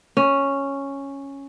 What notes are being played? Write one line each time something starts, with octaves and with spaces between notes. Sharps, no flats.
C#4